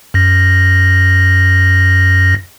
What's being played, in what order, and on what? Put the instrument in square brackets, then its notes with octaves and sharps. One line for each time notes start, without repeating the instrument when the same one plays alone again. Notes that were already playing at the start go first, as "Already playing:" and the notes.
[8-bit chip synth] F#2 A#6